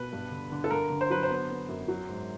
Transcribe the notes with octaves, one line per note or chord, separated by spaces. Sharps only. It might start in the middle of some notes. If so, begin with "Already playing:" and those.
Already playing: B2 B4
G2
D3
D3
A4
G2 A#4
D3
C5
F#3 B4
C5
B3
B3
F#2
F#3
G#2